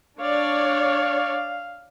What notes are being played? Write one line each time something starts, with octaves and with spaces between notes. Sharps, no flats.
D4 C#5 D5 F5